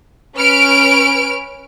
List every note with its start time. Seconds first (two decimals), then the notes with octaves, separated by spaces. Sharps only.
0.37 C#4 B4 F6 D7